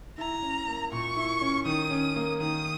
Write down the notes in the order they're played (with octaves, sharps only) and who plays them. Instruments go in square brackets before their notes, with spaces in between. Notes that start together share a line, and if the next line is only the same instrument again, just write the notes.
[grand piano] E4 [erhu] A#5
[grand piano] C#4
A#3
[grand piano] A#2 [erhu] C#6
[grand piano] E4
C#4
[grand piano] D#3 [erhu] D#6
[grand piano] C#4
A#3
[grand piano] D#3 [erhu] D#6